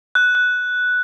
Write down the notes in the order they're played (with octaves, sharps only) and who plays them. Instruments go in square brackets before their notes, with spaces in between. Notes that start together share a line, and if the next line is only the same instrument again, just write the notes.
[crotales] F#6
F#6